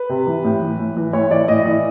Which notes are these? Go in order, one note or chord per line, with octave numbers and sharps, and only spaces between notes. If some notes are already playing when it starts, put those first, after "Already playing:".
Already playing: B4
C3
E3
A2
E3
A2
E3
A2 C#5
E3 D5
A2 D#5
E3